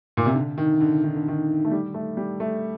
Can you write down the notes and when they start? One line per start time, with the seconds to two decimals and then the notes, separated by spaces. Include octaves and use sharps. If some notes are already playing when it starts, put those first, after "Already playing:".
0.17 A#2
0.26 C3
0.34 D3
0.58 D#3
0.81 D3
1.03 D#3
1.16 D3
1.28 D#3
1.65 A3
1.71 G3
1.94 A3
2.17 G3
2.40 A3